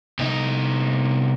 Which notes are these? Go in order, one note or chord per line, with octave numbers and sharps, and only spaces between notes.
C2 D#4